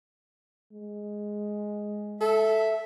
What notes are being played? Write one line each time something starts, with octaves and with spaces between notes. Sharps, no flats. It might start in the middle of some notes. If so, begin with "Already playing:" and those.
G#3
A4 E5